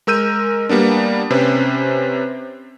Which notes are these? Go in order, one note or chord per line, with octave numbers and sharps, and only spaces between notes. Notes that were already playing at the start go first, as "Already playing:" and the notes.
G#3 A#4 E6 G6 D#7
G3 A#3 B3 D4
C3 C#4 B4 C5